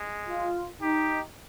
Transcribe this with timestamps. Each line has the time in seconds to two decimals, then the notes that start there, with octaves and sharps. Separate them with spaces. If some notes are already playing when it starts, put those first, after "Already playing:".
Already playing: G#3
0.28 F4
0.82 D#4 G4